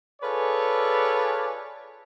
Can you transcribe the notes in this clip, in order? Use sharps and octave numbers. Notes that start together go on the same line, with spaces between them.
F4 G#4 A4 B4 C#5 D5